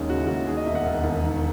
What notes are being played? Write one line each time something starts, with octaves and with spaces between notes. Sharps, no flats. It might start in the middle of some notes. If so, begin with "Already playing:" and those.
Already playing: D#2 G#3 C#4 D#4
C#3 F#4
E4
D#2 F#4
D#3 G#4
D#5
E1 E5
F#5
D#2
E1
D#3